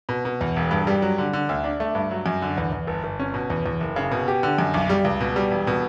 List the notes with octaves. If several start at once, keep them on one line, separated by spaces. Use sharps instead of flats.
B2
B2
E2
E1
G2
G3
F#3
D3
D3
D2
D4
A3
G2
F#3
F#2
D3
E2
E2
G1
G1
C#4
B2
E2
E2
F#1
C#3
B2
G4
D3
F#2
B1
G3
C#2
B2
G3
E1
B2